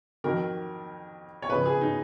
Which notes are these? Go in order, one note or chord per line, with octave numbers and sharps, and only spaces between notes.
F2 D#3 F#3 A#4
C#5
F2 C#3 F3 B4
G#4
D#4